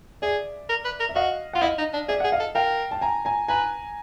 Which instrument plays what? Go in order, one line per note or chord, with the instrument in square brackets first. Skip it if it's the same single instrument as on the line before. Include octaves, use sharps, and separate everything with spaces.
[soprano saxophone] G#4 [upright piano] D5 E5
[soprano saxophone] A#4
B4
A#4
[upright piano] E5
[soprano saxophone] F#4 [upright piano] D#5 F5
[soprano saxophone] F4 [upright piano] F#5
[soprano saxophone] E4 [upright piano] D#5 F5
[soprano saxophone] D#4
D4
[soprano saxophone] G#4 [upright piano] D5 E5
[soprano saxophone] G#4 [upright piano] E5 F#5
[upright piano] D#5 F5
[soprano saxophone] A4
[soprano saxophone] A#4 [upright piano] F5 G5
[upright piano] A5
G#5 A#5
G#5 A#5
[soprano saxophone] B4 [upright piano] G#5 A#5